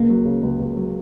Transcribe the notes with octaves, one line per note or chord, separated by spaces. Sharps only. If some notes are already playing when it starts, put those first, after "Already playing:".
Already playing: C#2 A#3
F#3
C#3
C#2
C#2
F#3